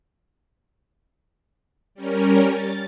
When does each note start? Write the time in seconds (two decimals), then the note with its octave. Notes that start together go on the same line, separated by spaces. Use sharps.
1.95 G3 C#4 A#4
2.48 A6